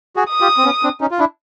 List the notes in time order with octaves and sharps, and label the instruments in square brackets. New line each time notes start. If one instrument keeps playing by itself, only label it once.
[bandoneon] F#4 G#4
[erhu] D#6
[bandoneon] F4 G4
C4
B3 C#4
C4 D4
C#4 D#4
F4
D4 E4